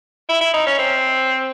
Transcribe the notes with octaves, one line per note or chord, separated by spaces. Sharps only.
E4
E4
D#4
C#4
C4